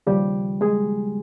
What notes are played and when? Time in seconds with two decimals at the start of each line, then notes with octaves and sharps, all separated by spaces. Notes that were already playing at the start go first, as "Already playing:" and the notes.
0.07 D#2 C#3 F3 G3 G4
0.61 G#3 G#4